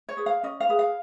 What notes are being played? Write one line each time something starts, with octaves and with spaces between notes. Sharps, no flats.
C#5
G#4 B4
F5
C#4 D#5
F5
G#4 B4
F5